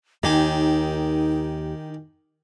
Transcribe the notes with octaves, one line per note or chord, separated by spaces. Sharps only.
D#2 D#3 D#4 G4 G#5